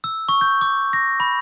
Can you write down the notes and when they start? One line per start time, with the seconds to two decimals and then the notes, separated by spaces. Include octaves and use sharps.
0.04 E6
0.29 C#6
0.41 G6
0.61 D6
0.93 A#6
1.20 B5